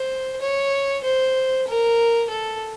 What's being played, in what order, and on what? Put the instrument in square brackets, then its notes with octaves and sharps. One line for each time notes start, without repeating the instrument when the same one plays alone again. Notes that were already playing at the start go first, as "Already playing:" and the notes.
Already playing: [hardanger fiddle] C5
C#5
C5
A#4
A4